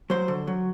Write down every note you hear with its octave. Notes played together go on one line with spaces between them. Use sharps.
F#3 C5
D3
F#3